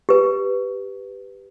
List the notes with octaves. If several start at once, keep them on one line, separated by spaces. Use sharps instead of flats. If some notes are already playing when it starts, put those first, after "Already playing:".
G4 B4